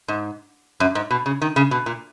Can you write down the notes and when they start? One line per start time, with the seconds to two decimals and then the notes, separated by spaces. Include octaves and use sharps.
0.08 G#2
0.80 F#2
0.95 G#2
1.11 B2
1.26 C#3
1.42 D#3
1.56 C#3
1.71 B2
1.86 A#2